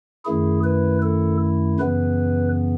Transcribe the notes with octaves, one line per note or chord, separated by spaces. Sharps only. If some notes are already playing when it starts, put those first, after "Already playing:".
F#2 D#3 A3 E4 G#4
B4
A4
F#2 C#3 E3 B3 B4